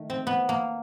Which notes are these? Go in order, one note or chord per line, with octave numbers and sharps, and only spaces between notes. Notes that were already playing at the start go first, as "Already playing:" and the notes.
Already playing: D#3 A3
C4
B3
A#3